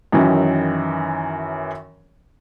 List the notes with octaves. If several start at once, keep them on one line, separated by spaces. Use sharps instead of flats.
F#2 D#3 E3 C#4